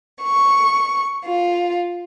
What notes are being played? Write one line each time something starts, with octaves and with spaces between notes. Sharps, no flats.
C#6
F4